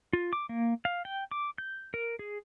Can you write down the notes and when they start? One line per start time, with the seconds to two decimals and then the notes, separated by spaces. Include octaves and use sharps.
0.13 F4
0.33 D6
0.49 A#3
0.85 F5
1.05 G5
1.31 D6
1.58 G6
1.94 A#4
2.19 G#4